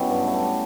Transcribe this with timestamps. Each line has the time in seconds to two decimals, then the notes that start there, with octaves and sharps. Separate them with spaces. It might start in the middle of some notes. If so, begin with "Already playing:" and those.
Already playing: B2 F#3 B3 C#4 E4 G4
0.08 G2
0.26 A3